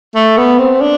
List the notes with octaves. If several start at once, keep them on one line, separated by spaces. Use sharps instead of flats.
A3
B3
C4
D4